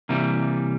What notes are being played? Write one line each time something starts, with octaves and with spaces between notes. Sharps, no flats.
C3 E3 G3 A#3